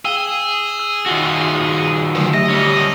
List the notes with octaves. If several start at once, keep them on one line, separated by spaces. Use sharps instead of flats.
G#4 F5 G5 E6 E7 G7
E6
D#3 F4 F#4
A#2 D3 F3 F#3 A3
G4 D#5 E5 A#6
G3 C#4